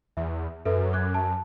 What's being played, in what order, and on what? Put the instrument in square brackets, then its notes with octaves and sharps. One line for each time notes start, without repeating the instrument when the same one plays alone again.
[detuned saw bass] E2 [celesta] E5
[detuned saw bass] F#2 [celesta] A4 B4 E5
[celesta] D6 F#6 G#6
A5